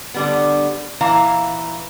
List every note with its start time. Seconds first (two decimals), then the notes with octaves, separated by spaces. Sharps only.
0.14 D3 G3 B3
1.01 A#2 E3 F5 A#5